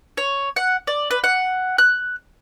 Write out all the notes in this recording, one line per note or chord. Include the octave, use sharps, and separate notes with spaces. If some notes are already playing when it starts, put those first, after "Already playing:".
C#5
F#5
D5
B4
F#5
F#6